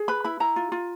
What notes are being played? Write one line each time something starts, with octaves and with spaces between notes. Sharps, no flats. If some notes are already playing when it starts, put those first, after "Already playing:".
Already playing: G#4
B4 B5
E4 B5
E4 A#5
F4
F4